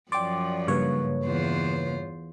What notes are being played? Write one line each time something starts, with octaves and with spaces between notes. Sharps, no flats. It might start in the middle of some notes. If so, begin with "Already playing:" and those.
F#2 F3 D5 G5 C6 D6
G2 C#3 A#3 B4 C#5
E2 F4 C5